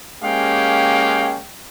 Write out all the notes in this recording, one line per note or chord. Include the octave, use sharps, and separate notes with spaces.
G#3 A#3 C#4 G4 F5 G5